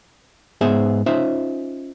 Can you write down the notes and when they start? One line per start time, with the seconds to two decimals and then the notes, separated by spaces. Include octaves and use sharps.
0.61 G#2 B3 G#4 C5 E5
1.06 C#4 D#4 F4 C5 E5